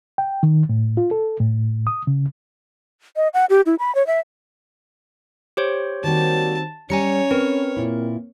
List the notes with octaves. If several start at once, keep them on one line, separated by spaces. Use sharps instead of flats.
G5
D#3
A2
F4
A4
A2
D#6
C#3
D#5
F#5
G4
E4
B5
C#5
E5
G4 C5 C#5
D#3 G3 A#3 C4 F#4 A5
G3 C#4 C#5 G#5 A#5 C#7
C4 A#4 B4
A#2 E4